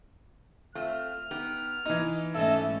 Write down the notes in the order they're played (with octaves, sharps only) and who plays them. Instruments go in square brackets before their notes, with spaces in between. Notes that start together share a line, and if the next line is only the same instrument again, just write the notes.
[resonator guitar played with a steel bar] A3 C4 F4 [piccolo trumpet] F6
[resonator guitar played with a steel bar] B3 D#4 G4
[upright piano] E3 D#4 [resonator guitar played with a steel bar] D#5
[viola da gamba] G#2 A3 C#4 [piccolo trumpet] A4 [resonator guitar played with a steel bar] D#5 E5